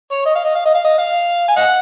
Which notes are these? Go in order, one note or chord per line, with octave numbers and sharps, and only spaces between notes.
C#5
D#5
F5
D#5
F5
D#5
F5
D#5
F5
G#5
D#5 F#5